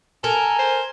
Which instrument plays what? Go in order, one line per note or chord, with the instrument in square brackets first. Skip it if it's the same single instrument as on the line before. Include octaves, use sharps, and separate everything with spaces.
[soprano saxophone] A4 [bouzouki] A#4 [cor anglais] G#5
[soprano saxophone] C5